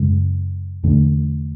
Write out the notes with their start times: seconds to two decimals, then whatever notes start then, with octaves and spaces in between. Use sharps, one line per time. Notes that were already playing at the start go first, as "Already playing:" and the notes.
Already playing: F#2 C#3 G#3
0.83 E2 D3 A3